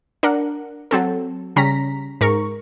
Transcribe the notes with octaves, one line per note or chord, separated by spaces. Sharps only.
D4 A#4 F#5
F#3 C4 A4
C#3 G3 C#4 A#5 A#6 B6
G#2 A#4 C#6